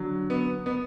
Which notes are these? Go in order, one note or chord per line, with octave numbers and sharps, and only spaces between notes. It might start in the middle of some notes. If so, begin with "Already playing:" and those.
Already playing: D3 F#3
B3
B3